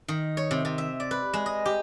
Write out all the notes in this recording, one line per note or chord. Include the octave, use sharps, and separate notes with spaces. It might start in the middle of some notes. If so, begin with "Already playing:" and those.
D#3
C#5
C3
C3
E5
D5
B4
G#3
D#5
G4